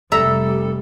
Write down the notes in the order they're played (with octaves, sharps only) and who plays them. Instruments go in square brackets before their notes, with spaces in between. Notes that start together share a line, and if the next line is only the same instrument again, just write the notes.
[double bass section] F1 G3 [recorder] A4 [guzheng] E5 A#5